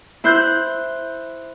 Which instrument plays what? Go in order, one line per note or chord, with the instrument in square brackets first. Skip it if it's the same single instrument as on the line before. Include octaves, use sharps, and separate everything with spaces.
[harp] E4 C5 F#6 G6